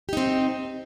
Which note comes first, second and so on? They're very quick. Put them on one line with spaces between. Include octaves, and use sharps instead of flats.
G4 D#4 C4